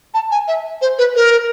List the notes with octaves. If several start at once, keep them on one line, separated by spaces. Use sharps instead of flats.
A5
G#5
E5
C5
B4
A#4